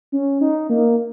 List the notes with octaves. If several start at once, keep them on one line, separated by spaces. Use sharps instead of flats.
C#4
D#4
A#3